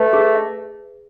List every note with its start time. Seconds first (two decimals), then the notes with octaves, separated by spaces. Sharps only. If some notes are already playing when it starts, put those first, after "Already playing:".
Already playing: A3 B4
0.13 G#4
0.35 E5